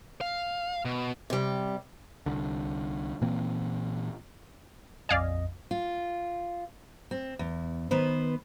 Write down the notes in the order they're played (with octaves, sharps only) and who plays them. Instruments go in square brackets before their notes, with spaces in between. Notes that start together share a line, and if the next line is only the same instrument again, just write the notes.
[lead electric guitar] F5
B2
[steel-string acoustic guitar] C3 G3
[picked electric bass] C2 D3
A#2 E3 A#3 C4
[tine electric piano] A#1 F2 D#5 [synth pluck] D5 F5 G#5
[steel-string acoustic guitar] F4
C4
E2
D#3 B3 B4 C5